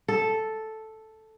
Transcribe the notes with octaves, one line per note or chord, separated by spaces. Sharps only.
A4